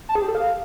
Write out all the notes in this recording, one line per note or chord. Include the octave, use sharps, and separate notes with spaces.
A5
G#4
G4
A4
F5